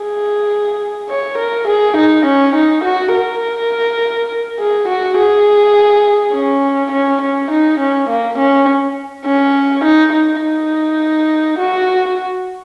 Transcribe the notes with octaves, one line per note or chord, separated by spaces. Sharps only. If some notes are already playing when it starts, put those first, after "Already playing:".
Already playing: G#4
C#5
A#4
G#4
D#4
C#4
D#4
F#4
A#4
G#4
F#4
G#4
C#4
C#4
C#4
D#4
C#4
A#3
C#4
C#4
D#4
D#4
D#4
F#4